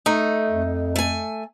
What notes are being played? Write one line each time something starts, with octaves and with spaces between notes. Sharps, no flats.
A3 D#4
F2
A3 G#5